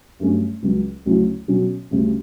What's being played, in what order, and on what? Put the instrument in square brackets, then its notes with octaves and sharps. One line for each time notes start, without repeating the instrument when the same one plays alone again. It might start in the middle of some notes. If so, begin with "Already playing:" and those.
[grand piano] G2 F#3 A3 C#4
C#2 C#3 F#3
D2 C#3 F#3 C#4 E4
B2 F#3 C#4
D2 C#3 G3